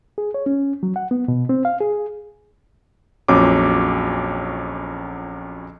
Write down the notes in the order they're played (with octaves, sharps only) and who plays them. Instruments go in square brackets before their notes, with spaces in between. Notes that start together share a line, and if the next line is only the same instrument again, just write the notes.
[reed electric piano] G#4
C#5
C#4
F#3
F#5
B3
B2
C4
F5
G#4
[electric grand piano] A#1 F2 F#3 C#4 D6